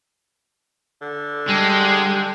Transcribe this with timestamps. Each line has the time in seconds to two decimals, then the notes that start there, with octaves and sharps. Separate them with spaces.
1.02 D3
1.49 G3 G#3 D4 G5